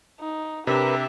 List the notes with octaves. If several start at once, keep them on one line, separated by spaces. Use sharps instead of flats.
D#4
C3 D4 G4 A#4 B4 E5